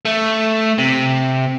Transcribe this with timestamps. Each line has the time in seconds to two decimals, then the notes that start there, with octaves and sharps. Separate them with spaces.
0.05 A3
0.78 C3